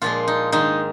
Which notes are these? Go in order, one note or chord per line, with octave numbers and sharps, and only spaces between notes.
A#2 F3 G#3 F4
D#4
G#2 D#3 G#3 D#4